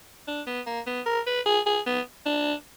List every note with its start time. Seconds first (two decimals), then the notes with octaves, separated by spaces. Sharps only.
0.27 D4
0.47 B3
0.66 A#3
0.87 B3
1.06 A#4
1.27 B4
1.46 G#4
1.66 G#4
1.86 B3
2.26 D4